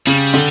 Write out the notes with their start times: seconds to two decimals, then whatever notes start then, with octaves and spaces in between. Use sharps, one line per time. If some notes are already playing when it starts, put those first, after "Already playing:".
0.07 C#3 G3
0.34 D3